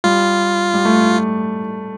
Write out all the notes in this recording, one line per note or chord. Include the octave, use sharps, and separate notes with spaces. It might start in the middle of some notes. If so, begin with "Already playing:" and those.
G3 F4
G3
A3